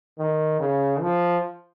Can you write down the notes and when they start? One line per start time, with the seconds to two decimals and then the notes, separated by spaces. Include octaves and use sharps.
0.18 D#3
0.60 C#3
1.00 F3